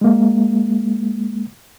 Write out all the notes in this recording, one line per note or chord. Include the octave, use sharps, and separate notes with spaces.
G#3 A#3